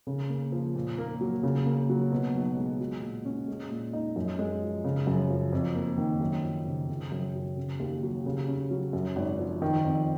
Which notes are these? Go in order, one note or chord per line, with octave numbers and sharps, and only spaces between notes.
C#3
A#3
F3
A#2
A#3
F#3
C#3
A#3
F#3
B2
B1
G#3
F#3
A#2
C#4
G#3
A#2
D#4
F#2
G#3
F3
C#3
F#2
F3
F2
A#3
D#3
F#2
F3
C#3
C#3
F#2
F#3
C#3
D#2
F#3
C#3
C#4
F#3
F#2
G#1
F3
D#3
F2